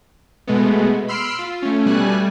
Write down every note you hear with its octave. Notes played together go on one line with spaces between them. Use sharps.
B2 G#3 A3 B3
B5 C6 E6 F6 C7 D7
F4
A3 C#4
B2 G3 A3 G#5 F#6
G3